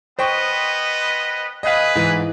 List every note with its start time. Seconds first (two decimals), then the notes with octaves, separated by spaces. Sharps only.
0.19 B3 B4 C5 D#5 G5 C#6
1.63 G#4 B4 D#5 F5
1.95 G#2 E3